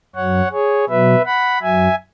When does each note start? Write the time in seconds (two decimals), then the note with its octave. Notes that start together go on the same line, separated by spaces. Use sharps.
0.16 F#2 F#3 C#5 F#5
0.52 G#4 C#5
0.89 B2 F#3 B4 E5
1.25 F#5 B5
1.62 F#2 F#3 E5 G#5